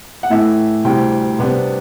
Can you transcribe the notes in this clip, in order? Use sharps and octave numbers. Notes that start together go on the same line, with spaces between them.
F#5
A2 E3 A3 E5
D2 C3 E3 G3 G5
C3 G3 B3 D4